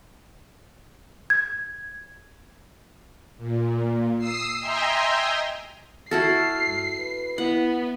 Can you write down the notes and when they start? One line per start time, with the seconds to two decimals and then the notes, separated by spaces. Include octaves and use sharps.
1.30 G#6
3.37 A#2
4.18 D#6 E6 C7
4.59 D#5 E5 G5 G#5 A#5 C6
6.11 E4 F#4 A4 F6 C7
6.66 G2
6.98 B4
7.38 B3 E4 F#5